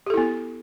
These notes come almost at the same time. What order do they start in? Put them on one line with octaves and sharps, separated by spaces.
G4 A4 E4 B3